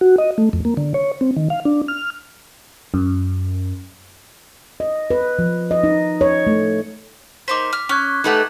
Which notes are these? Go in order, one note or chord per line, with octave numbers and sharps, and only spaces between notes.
F#4
D#5
A3
F2
A#3
D3
C#5
C4
D#3
F5
D4
F6
F#2
D#5
B4
F3
D#5
D#4
C#5
A3
A#3 D#4 C5 D6 B6
F6
C#4 C#6 F#6 G#6
A3 D#4 G4 B4 F#5